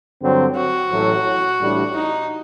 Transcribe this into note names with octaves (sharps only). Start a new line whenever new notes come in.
G2 D3 F#3 C4
F#4
A1 A2 F#3 A3
A1 A2 G3 D4
D#4